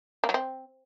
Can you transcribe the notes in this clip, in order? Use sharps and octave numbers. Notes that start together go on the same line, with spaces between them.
A#3
F#3
C4